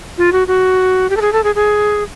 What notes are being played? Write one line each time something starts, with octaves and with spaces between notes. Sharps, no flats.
F4
F#4
F#4
G4
A4
G#4
A4
G#4
G#4